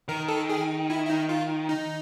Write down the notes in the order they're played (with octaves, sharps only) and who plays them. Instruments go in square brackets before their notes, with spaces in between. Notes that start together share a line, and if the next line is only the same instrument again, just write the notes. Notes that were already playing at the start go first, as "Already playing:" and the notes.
[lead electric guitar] D#3 [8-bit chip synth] A#4
[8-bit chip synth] A4
G#4
E4
E4
D#4
F4
D#4